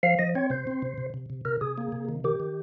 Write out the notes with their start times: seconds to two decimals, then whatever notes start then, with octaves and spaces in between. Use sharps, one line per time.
0.03 F3 F5
0.19 F3 D#5
0.35 C4 C#5
0.50 C3 C5
0.67 C4
0.82 C3
0.98 C3
1.14 C3
1.30 C3
1.45 C3 A#4
1.61 C3 G#4
1.78 A#3
1.92 C3
2.09 D#3
2.24 D#3 G4
2.40 D#3